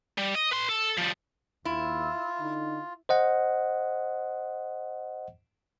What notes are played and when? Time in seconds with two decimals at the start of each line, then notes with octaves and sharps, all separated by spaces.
0.18 G3
0.35 D#5
0.52 B4 C6
0.69 A4
0.98 F3 G3
1.65 D#2 E4 F4
2.40 D3 D#4
3.09 C5 D#5 F#5